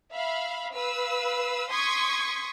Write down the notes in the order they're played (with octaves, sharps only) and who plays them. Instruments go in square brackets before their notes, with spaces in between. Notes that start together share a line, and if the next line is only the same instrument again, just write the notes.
[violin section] E5 F5 B5
B4 F5 E6
C6 C#6 D#6 G#6 B6